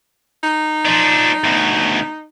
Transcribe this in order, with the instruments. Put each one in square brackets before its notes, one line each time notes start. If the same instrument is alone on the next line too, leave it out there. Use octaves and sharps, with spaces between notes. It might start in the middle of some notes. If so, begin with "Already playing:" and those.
[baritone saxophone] D#4
[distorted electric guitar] F3 D4
D2 B2